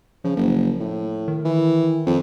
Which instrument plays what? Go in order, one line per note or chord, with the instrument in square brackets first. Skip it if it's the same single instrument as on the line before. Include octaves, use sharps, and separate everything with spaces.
[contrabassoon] C#3 [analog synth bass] F3
[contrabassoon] F#1
A2
[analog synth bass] D#3
[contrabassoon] E3
F2